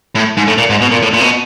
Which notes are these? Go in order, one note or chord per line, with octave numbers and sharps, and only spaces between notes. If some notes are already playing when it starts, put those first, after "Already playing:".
A2
G#2
A2
A#2
G#2
B2
A#2
A2
A#2
C3
B2